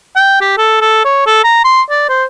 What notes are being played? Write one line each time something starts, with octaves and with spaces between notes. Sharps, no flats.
G5
G4
A4
A4
C#5
A4
A#5
C6
D5
C5